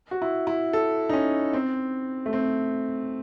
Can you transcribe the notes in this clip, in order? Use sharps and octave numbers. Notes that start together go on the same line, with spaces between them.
F#4
E4
E4
A4
D#4
C#4
C4
A3
C4